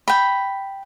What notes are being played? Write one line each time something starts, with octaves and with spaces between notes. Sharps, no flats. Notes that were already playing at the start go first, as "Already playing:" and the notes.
G5 B5